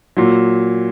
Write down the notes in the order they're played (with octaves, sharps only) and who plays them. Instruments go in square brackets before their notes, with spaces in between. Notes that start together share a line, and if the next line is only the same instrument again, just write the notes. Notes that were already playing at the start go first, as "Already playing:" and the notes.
[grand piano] A#2 F#3